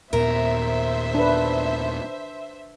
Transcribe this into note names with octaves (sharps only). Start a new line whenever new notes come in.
D#2 A#2 B3 A#4 C5 E5
D4 B4